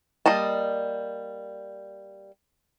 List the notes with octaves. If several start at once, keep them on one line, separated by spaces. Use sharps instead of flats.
G3 A#3 D#5 A5